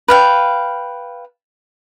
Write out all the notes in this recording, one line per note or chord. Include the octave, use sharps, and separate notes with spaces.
B4 F5 G5